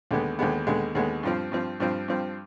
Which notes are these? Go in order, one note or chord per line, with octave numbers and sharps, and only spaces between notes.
D#2 D3 G#3 B3
D#2 D3 G#3 B3
D#2 D3 G#3 B3
D#2 D3 G#3 B3
G2 F3 C4
G2 F3 C4
G2 F3 C4
G2 F3 C4